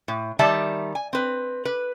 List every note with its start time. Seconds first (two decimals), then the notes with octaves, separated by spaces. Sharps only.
0.08 A2
0.39 D#3 G3 D5 E5 A5
0.95 G#5
1.13 C4 B4
1.65 B4